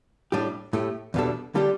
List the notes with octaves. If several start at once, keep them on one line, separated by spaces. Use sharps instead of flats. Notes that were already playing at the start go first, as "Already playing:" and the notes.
A2 G3 D4 G4
A2 A3 G4
E2 B2 G3 D4 A4
D3 G3 D4 G4